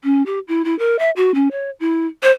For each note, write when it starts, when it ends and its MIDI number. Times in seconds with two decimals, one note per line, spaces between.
0.04 0.24 61
0.26 0.39 67
0.48 0.62 64
0.65 0.77 64
0.79 0.99 70
0.99 1.10 76
1.16 1.32 66
1.35 1.48 61
1.51 1.70 73
1.80 2.06 64
2.23 2.31 72